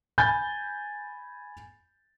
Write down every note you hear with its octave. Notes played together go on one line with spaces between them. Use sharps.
G#5 B5 G6 A6